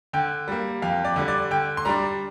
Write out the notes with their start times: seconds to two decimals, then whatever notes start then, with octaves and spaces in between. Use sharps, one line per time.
0.13 D3 G5
0.48 G3 A#3
0.82 F2 F5
1.05 D5
1.16 D3 G3
1.28 D5
1.51 D3 G5
1.77 C6
1.85 G3 D4 A#5